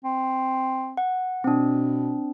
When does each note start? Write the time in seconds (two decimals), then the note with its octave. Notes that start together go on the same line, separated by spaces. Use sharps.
0.05 C4
0.97 F#5
1.44 B2 C4 D4